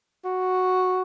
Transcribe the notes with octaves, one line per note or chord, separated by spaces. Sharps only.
F#4